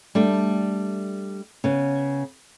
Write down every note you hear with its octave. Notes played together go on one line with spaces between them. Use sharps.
G3 A3 D4
C#3 B3